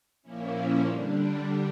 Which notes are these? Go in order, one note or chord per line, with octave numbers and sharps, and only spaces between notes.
A#2 F3 A#3 C#4 E4
D3 G3 D4